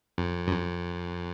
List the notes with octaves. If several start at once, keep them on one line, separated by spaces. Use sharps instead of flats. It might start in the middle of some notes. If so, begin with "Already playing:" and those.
F2
F#2
F2